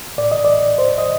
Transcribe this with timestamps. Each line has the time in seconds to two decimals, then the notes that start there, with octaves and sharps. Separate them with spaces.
0.18 A2 D5
0.32 D#5
0.45 D5
0.78 C5
0.98 D#5